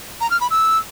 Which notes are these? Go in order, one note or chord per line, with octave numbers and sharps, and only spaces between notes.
A#5
F6
B5
E6